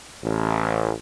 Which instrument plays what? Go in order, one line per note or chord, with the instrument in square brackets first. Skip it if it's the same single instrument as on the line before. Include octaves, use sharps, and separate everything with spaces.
[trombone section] A1